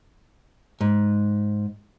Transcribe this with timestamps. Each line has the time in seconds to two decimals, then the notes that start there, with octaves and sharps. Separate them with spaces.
0.81 G#2